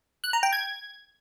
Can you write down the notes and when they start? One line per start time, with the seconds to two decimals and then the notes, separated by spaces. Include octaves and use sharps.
0.24 F#6
0.33 A#5
0.43 G5
0.53 G#6